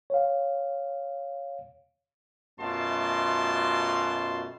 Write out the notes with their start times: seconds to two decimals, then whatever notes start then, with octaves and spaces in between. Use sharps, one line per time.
0.10 C#5 F5
2.59 F#2 B2 A3 F4 A5 C6